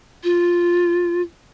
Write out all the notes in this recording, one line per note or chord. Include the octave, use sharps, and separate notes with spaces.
F4